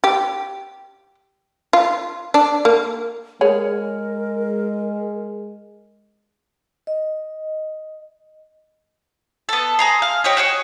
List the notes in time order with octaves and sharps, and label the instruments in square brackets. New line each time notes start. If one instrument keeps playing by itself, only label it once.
[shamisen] G4
F4
D4
A#3
[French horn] G#3 [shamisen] G#4 C#5 [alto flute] A#4
[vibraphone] D#5
[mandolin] B3 A4
G#4 A#5 C6
F5
G4 C#5 D#5
F#4 G#4 C#5